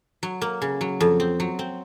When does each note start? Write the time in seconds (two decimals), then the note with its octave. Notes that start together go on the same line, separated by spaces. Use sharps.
0.23 F#3
0.42 A#3
0.62 C#3
0.81 F#3
1.00 F2
1.20 C4
1.40 F#3
1.59 C4